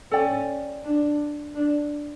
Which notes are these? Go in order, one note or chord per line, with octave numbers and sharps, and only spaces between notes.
C#4 A4 D5 G5
D4
D4